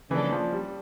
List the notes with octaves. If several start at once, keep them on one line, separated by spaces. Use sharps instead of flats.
C#3 E3 F3 A#3 D4 A4
F3
G3